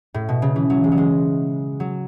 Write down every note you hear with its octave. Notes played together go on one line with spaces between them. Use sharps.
A2
B2
C#3
E3
F#3
G#3
F#3
G#3
F#3